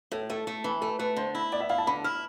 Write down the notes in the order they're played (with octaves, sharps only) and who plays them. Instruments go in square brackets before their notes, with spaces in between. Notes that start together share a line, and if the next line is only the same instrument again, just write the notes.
[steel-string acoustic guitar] A2 [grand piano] A4
[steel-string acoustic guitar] A3 [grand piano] A4
[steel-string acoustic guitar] A3
E3
[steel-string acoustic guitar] A3 [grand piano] A4
[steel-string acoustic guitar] A3 [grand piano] B4
[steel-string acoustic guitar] D3 [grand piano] C5
[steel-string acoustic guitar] E4
[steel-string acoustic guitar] B3 [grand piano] D5
[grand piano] E5
[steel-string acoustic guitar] E4 [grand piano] F5
[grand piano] A5
[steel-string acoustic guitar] D3 [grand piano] B5
[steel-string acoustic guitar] E4 [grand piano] F6